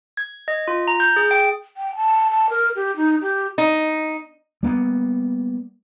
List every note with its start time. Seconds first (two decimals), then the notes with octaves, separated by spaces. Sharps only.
0.17 G#6
0.48 D#5
0.68 F4
0.88 A#5
1.00 G6
1.16 G#4
1.31 G5
1.77 G5
1.96 A5
2.31 A5
2.50 A#4
2.76 G4
2.96 D#4
3.22 G4
3.58 D#4
4.63 G3 A#3 B3